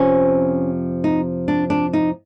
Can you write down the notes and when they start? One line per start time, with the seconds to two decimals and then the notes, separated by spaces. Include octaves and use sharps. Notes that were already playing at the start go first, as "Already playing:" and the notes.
Already playing: F2 C3 F3 C#4
1.04 D#4
1.48 D4
1.70 D4
1.93 D#4